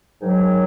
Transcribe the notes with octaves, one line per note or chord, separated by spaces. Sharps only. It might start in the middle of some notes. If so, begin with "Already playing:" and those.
G#2 D#3 F#3